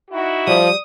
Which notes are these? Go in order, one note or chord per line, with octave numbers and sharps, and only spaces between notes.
D#4 E4 F#4
F3 G3 D#6